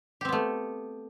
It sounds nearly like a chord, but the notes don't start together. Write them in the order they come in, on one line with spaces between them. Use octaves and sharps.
G4 C4 B3 A3